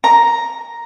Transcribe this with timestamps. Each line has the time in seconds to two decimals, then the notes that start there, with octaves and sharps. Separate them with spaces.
0.04 A#5